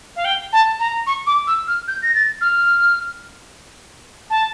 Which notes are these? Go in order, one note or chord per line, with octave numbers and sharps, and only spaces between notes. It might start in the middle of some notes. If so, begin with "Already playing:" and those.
F5
G5
A5
A#5
C#6
D6
E6
F6
G6
A#6
A6
F6
A5